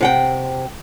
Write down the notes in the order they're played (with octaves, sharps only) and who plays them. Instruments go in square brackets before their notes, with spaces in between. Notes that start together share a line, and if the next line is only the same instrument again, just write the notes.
[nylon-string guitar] C3 F#5 G5